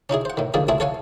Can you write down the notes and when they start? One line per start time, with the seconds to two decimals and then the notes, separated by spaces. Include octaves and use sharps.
0.10 C#4 D#4 E4 G#4
0.25 C5 F#5
0.37 A2 D#3
0.54 D3 D#3 F3 A#3 G#4
0.68 C#2 A3 C4 E4 G#4 A5
0.80 A4 C#5 F5 F#5 G#5